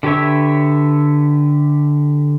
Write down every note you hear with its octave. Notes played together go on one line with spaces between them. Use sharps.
D3 G4 B4 C#5 E5